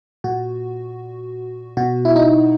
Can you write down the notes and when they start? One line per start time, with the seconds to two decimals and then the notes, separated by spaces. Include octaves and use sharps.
0.24 A#2 F#4
1.77 B2 F#4
2.05 E4
2.16 D#4